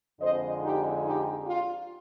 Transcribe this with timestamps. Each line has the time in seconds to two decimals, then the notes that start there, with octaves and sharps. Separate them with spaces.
0.20 F2 D3 G#3 C5 D#5
0.61 D#4 G4
1.03 D#4 G4
1.45 F4